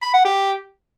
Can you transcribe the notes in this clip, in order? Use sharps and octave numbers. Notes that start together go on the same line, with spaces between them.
B5
F#5
G4